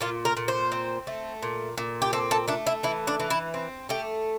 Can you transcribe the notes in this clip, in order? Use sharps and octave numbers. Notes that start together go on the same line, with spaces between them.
A#2 F4
A#4
A#2
C5
C4
A3
A#2
A#2
G4
C4 A4
A4
A3 D4
E4
E3 E4
D4
E3
E4
C4
A3 G4